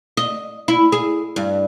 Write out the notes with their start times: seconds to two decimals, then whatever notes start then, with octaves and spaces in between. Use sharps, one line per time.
0.17 D#5
0.68 E4
0.92 G#4
1.36 G2